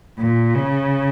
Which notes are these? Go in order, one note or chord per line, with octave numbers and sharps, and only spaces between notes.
A#2
C#3